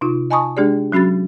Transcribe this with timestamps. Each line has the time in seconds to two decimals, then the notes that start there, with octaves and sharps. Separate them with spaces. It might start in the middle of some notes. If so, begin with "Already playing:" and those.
0.01 C3 D#4 F4
0.30 D#5 G#5 A5 B5 C#6 D#6
0.57 G#3 D4 G4 G#4 D5
0.92 F#3 C#4 F#4 B5 A6